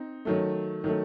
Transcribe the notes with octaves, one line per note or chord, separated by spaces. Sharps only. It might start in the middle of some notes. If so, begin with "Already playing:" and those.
Already playing: C4 D#4
D#3 F#3 A3
D#3 F#3 A3